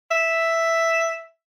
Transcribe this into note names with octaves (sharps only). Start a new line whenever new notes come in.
E5